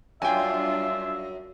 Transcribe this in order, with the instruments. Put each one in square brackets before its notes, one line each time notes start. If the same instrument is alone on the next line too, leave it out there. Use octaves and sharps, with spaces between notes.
[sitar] F#2 [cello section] G3 D4 F4 [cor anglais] E5 [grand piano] G5 G#5